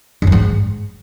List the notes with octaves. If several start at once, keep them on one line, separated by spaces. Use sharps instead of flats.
F#2
E3
G#2